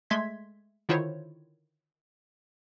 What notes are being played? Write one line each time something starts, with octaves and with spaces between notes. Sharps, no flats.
G#3 A3 E5 C6 G#6 B6
D3 D#3 E4 F4 C5 C#5